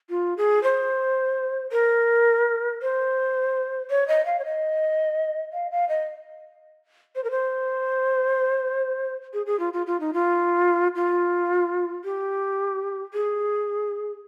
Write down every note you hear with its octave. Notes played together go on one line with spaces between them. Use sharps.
F4
G#4
C5
A#4
C5
C#5
D#5
F5
C#5
D#5
F5
F5
D#5
C5
A#4
C5
G#4
G#4
F4
F4
F4
D#4
F4
F4
G4
G#4